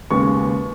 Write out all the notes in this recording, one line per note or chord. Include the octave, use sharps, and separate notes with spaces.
D#2 C#3 G#3 B3 C#6